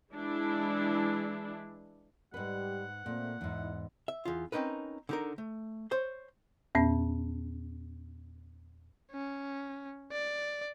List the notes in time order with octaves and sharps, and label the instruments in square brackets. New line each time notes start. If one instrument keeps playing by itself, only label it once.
[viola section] E3 G#3 D4 E4
[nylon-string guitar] G#2 B4 [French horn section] G3 [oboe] F#5
[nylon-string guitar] A#2 [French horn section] A3 A#3 C4
[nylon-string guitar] E2 G#2 [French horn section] D#4 E4
[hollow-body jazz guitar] E5
E2 F4
C4 C#4 D#4 A#4 B4
D3 D#4 A#4
A3
C5 C#5 C6
[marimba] E2 A#2 B3 C#4
[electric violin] C#4
D5